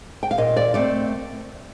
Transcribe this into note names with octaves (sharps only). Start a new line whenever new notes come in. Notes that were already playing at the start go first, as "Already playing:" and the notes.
G5
F5
A#2 D#5
D5
A3 C4 D5